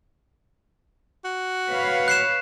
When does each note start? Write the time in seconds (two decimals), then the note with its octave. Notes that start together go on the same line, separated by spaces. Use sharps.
1.25 F#4
1.70 B4 C#5 F5
2.08 F#6 C7 E7